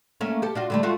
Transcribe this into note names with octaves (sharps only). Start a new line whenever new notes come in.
A3 A#3 C#4
G4 A4
D4 F4 F#4
D3 G3 A3
A3 F4 F#4